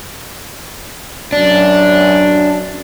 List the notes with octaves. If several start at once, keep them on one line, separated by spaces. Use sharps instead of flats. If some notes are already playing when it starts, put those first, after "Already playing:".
F#2 D4